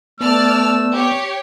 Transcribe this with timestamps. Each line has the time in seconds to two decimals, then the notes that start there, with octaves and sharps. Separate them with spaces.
0.21 A3 B3 D5 A5 E6 F6
0.92 G4 C#5